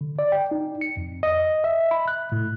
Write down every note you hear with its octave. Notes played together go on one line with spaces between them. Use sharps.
D3
D5
G5
D#4
C#7
F2
D#5
E5
B5
F#6
A2